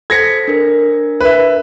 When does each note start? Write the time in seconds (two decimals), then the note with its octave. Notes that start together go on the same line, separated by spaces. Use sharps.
0.10 A4 C5 G#6 A#6 B6 C#7
0.48 D4 A#4
1.20 B4 E5